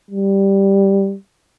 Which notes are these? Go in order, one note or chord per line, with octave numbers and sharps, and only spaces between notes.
G3